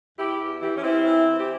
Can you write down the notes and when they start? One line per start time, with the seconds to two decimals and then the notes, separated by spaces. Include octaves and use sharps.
0.18 E2 E4 G4
0.40 E2
0.62 E3 E4 G4
0.77 C#4
0.83 E3 C4 E4
1.05 E3
1.27 E3
1.38 G4